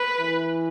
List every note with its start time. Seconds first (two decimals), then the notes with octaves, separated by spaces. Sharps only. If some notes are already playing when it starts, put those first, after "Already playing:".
Already playing: B4
0.19 E3